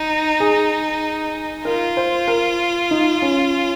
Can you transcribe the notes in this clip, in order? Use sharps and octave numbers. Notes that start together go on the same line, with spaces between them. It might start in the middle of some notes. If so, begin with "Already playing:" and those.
Already playing: D#4
G#4
F4 A#4
C5
A#4
D#4
C#4